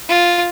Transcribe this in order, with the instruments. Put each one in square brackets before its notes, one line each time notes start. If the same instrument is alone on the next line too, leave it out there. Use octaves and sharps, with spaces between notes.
[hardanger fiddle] F4